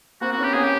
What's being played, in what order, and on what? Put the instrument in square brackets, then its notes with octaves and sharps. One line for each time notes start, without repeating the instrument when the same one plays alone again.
[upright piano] A#3 C4 [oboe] F#4
[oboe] F#4
[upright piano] B3 C#4
[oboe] G4
[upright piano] B3 C#4 [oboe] G#4
[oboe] G4